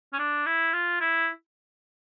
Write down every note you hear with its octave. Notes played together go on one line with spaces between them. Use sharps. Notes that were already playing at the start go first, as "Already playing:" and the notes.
C#4
D4
E4
F4
E4